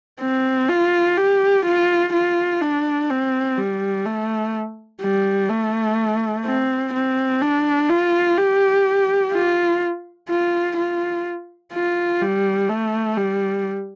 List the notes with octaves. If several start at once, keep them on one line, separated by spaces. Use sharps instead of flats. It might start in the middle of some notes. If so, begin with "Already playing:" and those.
C4
F4
G4
F4
F4
D4
C4
G3
A3
G3
A3
C4
C4
D4
F4
G4
F4
F4
F4
F4
G3
A3
G3